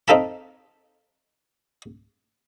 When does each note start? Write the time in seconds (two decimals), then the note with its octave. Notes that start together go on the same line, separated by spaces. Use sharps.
0.08 C4 D#4 A4 F5 A5 B5